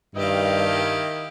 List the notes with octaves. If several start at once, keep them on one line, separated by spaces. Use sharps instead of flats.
G2 D#3 E4 G4 D#5 F5